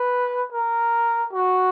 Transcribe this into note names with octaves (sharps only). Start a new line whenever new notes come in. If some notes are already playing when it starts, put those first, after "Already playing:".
Already playing: B4
A#4
F#4